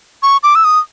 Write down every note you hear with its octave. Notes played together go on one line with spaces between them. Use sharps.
C#6
D6
E6
D#6